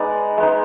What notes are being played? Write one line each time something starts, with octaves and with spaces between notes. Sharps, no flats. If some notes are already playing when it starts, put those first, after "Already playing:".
Already playing: G#3 B3 D#4 D5
G#3 B3 D#4